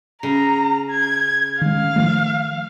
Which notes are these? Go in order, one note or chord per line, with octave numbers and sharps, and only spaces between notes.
C#3 A#5
G#6
D#3 G#3 F5
D#3 F3 A3